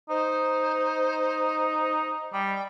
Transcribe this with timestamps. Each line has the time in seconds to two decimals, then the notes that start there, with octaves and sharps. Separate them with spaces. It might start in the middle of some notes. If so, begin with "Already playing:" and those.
0.09 D#4 C5
2.33 G3 G5